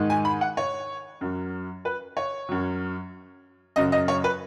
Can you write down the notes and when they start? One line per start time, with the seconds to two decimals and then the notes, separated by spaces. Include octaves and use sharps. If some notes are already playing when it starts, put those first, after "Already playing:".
Already playing: G#2 D#3 G#3
0.10 G#5
0.25 B5
0.41 F#5
0.57 C#5
1.21 F#2 F#3
1.85 B4
2.17 C#5
2.49 F#2 F#3
3.76 F#2 C#3 F#3 D#5
3.92 D#5
4.08 C#5
4.24 B4